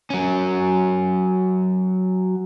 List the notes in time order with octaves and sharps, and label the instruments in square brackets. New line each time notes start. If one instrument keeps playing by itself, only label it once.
[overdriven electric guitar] F#3 C#4